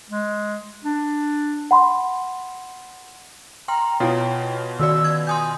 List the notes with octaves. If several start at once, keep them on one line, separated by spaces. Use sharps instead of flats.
G#3
D4
F#5 B5 C6
G5 A#5 C6
B2 E4 F4 C#5 G5
D#3 F#4 D5 E6
G#6
G#5 C6 D#6 G6